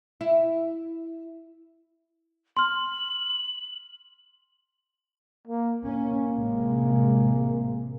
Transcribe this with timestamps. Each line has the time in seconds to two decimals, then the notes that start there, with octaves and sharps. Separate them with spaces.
0.21 E4
2.57 C6 F6 F#7
5.47 A#3
5.84 A#3 C#4
6.30 A1 C3 G#3